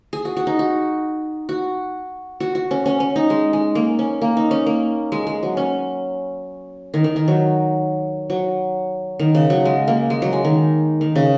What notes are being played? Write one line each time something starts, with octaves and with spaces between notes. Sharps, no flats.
G#4
F#4
F#4
D#4
F#4
F#4
F#4
F#4
C#4
C#4
C#4
D#4
G#3
G#3
A#3
C#4
A#3
D#4
C#4
A#3
G#3
G#3
F#3
C#4
D#3
D#3
D#3
F#3
F#3
D#3
C#3
F#3
G#3
A#3
G#3
F#3
G#3
D#3
D#3
C#3